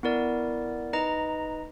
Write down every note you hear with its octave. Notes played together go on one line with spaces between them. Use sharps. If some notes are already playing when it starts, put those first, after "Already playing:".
B3 E4 A#4 D5
D#4 B4 D#5 A#5